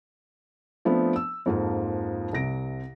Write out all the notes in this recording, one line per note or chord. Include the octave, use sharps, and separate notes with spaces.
F3 A3 B3 C4 D4
E6
F2 G#2 F3 A#3 F4
C2 C3 A#6 D7